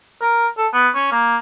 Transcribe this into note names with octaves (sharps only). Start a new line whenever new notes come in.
A#4
A4
B3
C#4
A#3